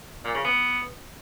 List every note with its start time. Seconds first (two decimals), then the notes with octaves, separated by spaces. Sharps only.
0.24 A#2
0.34 C#3
0.44 B3